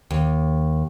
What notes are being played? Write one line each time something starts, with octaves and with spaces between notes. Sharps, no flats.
D#2